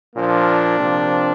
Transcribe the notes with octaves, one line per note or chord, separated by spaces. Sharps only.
A#2 F3 A#3 D4
C3 F3